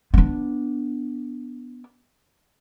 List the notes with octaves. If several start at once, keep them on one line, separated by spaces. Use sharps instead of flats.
B3 D4